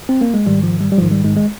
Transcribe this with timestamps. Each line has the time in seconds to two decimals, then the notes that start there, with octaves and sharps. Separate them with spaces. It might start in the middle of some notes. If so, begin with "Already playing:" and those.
0.09 C4
0.21 A#3
0.34 G#3
0.46 A#1 G#2 D#3 G3
0.63 F3
0.81 G3
0.92 G3
0.98 A#1 G#2 D#3 F3
1.11 G3
1.24 G#2 G#3
1.36 G#3